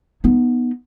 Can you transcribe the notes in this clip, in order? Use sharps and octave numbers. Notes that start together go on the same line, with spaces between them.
B3 D#4